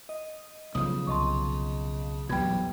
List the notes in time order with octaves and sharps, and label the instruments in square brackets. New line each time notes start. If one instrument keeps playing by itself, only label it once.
[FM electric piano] D#5
[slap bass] B1 F3 [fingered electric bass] C#3 [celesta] D#6
[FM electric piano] C2 D#5 A5 [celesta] C6 C#6
[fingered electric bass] A#1 E2 F#3 [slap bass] B2 G3 [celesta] G5 B5 G#6